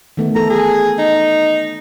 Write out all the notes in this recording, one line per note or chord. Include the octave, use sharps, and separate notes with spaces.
D#3 A3 B3
E3 A4 A#5
G#4
D#4